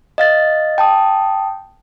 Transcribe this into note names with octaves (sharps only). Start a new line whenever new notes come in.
D#5 F5 A6
G5 A5 D#6